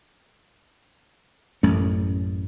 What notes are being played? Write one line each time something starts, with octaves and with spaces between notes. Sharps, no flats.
A1 F#2 A3 C#4